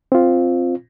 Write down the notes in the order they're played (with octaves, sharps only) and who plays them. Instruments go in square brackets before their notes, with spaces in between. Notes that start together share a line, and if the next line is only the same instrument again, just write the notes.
[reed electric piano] C4 F4